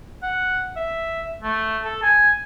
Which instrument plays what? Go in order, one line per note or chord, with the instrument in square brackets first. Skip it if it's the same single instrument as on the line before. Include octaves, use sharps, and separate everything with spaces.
[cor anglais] F#5
E5
A3
A4
G#5